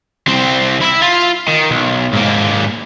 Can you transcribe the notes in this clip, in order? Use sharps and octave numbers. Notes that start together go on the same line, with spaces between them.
C2 C4
E4 E5
F4
D#3
B1
G#2 A#3